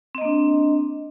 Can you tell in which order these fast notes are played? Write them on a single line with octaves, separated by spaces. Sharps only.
C4 D#5 A#3 D4